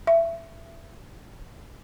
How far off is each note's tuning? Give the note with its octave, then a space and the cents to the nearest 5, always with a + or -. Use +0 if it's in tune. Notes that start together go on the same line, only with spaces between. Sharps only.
E5 +20